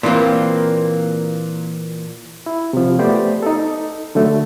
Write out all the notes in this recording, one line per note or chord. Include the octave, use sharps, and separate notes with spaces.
A#2 E3 A#3 C4
E4
C3 F3
A3 B3 G4 C5 D5
D#4 A4
D3 F#3 A3